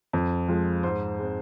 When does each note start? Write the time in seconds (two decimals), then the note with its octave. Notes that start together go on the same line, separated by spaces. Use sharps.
0.13 F2
0.48 F3 G#3
0.83 G#2 C5
1.19 G#3 C4